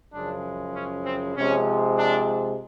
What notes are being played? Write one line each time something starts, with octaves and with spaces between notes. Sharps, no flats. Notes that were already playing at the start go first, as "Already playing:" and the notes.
F#2 C#3 F3 G#3 D4
C#4
C4
C3 F3 G#3 C#4
D4